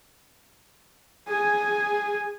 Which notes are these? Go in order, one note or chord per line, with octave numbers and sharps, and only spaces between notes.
G#4 G#5